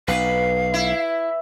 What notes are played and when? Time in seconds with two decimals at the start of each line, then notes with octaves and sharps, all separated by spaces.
0.08 B1 B4 F5
0.74 E4